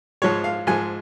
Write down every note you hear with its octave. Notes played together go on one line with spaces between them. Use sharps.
G#2 F3 G#3 C#5
F5
G#2 F3 G#3 G#5